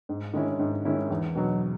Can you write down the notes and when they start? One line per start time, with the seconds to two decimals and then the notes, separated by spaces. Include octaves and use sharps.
0.09 G#2
0.34 D#3 G#3 C#4 E4
0.59 G#2
0.85 D#3 G#3 C#4 E4
1.10 E2
1.35 B2 F#3